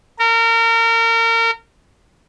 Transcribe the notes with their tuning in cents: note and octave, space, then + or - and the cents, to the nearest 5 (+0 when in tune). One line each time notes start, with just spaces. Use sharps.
A#4 -30